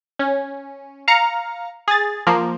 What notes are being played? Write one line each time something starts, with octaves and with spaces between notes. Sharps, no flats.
C#4
F5 A#5 C#7
G#4 A6
F3 A#3